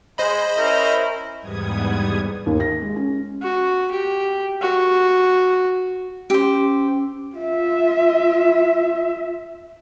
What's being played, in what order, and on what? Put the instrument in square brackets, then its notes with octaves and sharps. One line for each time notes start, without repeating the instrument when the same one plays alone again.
[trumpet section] G#3 [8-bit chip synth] C5 D#5 B5
[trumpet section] C#4 E4 A#4
[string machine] E2 G#2 G3 B3 D#6 G#6
[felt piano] D#2
A#6
G#3
C#4
[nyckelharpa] F#4
G4
F#4
[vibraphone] C#4 E6 [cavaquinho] G4 C5
[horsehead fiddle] F4 E5